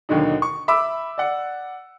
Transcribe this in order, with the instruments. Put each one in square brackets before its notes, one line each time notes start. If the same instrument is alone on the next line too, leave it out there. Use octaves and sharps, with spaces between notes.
[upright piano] D#2 B2 D3 F#3 D#4
C#6
E5 B5 D6 E6
D5 F#5